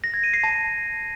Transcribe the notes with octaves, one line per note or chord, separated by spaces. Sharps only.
A#6
G#6
D#7
C7
A5